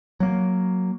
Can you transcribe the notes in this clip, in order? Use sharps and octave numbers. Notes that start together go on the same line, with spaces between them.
F#3 A#3